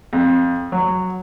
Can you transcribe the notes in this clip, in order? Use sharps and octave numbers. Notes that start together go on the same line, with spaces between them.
F2
F#3